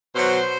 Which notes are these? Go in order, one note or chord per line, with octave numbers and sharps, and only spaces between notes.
B2 F#3 C5